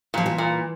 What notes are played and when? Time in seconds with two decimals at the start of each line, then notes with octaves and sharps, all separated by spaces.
0.14 A#2 F3
0.26 E3
0.38 A#2